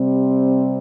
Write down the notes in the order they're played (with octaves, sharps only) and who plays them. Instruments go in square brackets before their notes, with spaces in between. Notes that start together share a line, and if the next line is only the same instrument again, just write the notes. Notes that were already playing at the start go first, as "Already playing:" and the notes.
Already playing: [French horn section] C3 G3 C4